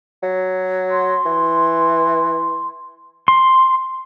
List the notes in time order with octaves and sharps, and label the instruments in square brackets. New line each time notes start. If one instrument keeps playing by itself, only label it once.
[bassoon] F#3
[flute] C6
[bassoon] E3
[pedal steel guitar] C6